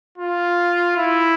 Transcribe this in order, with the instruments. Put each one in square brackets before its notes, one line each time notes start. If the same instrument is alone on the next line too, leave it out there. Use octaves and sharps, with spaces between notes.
[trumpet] F4
E4